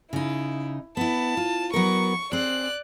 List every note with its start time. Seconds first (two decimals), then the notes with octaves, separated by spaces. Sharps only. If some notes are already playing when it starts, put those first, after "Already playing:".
0.13 C#3 D#4 E4
0.97 B3 E4 A5
1.37 F4
1.73 F#3 B3 A#4 C#6
2.32 C4 G#4 D5 F#6